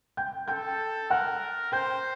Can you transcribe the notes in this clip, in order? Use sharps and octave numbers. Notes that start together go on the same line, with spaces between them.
G5 G6
A4 G5 G6
A#4 F#5 F#6
C5 G5 G6